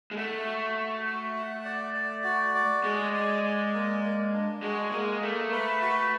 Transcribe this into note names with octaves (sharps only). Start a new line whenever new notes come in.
G#3
A3 F#5
F#4
F#4
F#4
F#5
D5
D5
F#4
D5
G#3 D5
D5
D5
A#3
A#3
D4
G#3 F#4
G#3 A#3
A3 A#3
B4
F#4